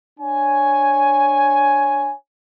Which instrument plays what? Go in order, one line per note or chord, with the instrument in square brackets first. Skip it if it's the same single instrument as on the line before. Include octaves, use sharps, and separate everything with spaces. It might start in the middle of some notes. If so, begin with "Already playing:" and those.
[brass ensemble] D4 C#5 G#5